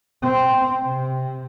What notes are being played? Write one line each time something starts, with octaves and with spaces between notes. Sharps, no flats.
C4
C3